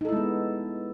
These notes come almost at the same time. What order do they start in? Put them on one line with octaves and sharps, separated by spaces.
D#4 A4 E4 G#3 B3